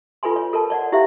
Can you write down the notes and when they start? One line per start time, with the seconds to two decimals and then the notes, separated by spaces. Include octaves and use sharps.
0.23 F4 A4 B4 G#5 C6
0.36 C#5
0.53 A4 A#4 C#5 A5
0.70 C#5 D5 F#5
0.92 E4 G4 C5 E5 F5